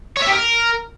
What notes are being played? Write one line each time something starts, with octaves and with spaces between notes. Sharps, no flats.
C#5
E5
G4
A#4